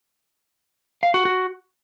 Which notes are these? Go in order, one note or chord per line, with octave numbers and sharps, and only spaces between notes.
F5
F#4
F#4